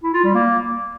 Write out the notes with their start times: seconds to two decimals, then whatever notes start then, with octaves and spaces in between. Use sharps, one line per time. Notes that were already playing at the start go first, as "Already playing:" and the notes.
0.03 E4
0.14 F4
0.24 G3
0.35 A#3